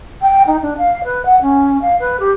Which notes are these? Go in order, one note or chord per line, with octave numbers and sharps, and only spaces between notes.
G5
D#4
D4
F5
B4
F#5
C#4
F5
B4
G4